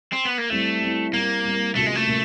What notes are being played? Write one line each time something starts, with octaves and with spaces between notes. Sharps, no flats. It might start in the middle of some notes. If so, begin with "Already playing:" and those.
C4
B3
A#3
G3 A3 C4 E4
G3 C4 E4
G3 A#3 C4 E4
G3 C4 E4
C3 F3 A3 A#3 C#4 F#4
G#3
A3
C3 F3 A#3 C#4 F#4